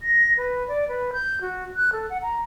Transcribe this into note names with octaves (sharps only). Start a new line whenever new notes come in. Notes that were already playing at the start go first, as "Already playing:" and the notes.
A#6
B4
D5
B4
G6
F#4
F#6
A4
F#5
A#5